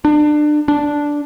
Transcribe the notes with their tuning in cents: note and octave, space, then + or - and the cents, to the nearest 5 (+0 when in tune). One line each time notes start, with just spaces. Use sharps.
D4 +30
D4 -5